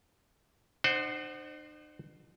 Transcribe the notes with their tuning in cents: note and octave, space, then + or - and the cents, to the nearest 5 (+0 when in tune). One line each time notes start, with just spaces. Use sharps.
D#4 -45 C5 +0 F#5 +15